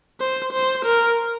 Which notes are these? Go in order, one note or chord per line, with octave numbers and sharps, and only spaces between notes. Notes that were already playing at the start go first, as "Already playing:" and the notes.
C5
C5
A#4